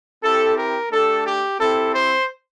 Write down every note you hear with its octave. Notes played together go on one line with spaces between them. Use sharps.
C4 E4 G4 A4
A#4
A3 D4 G4 A4
G4
C4 E4 G4 A4
C5